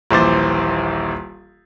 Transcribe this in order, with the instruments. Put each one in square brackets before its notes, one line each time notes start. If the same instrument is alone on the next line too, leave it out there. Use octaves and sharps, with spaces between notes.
[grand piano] D#1 A#1 E3 C5 D6 A6